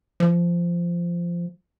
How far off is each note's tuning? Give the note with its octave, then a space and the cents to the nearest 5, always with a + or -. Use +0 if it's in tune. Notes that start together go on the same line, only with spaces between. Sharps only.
F3 -15